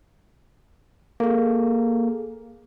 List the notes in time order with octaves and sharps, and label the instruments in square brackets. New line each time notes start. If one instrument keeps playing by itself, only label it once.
[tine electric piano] A#3 [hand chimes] G#4 A4